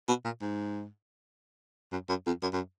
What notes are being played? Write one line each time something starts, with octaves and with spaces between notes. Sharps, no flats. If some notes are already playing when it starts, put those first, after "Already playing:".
B2
A#2
G#2
F#2
F#2
F2
F#2
F#2